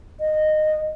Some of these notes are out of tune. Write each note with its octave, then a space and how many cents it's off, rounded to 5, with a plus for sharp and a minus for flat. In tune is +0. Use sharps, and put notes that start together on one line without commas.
D#5 -15